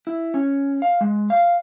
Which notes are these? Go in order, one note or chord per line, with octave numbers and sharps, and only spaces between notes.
E4
C#4
F5
G#3
F5